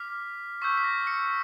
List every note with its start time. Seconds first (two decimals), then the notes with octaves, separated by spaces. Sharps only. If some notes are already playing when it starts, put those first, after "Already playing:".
Already playing: D6 F6 B6
0.61 C#6 E6 G6 B6
0.77 B6
0.84 A#6
1.07 C#7